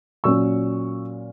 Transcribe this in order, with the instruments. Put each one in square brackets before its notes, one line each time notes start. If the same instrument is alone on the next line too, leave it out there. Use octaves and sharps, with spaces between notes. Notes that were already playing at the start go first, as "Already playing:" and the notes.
[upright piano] A#2 F#3 C#4 C#6 E6